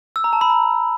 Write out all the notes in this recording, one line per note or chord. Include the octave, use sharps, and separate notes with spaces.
E6
A#5
A5
B5
A#5